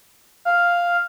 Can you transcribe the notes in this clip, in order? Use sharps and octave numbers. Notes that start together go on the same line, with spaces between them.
F5